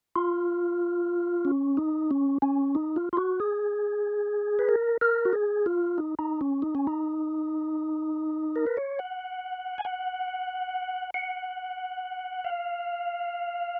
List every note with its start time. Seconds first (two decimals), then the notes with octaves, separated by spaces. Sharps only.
0.16 F4
1.45 C#4
1.77 D#4
2.11 C#4
2.42 C#4
2.75 D#4
2.96 F4
3.13 F4
3.17 F#4
3.40 G#4
4.59 B4
4.69 A#4
5.01 A#4
5.25 F#4
5.33 G#4
5.66 F4
5.98 D#4
6.19 D#4
6.41 C#4
6.62 D#4
6.75 C#4
6.87 D#4
8.56 A#4
8.67 B4
8.77 C#5
8.99 F#5
9.78 G#5
9.85 F#5
11.14 F#5
12.45 F5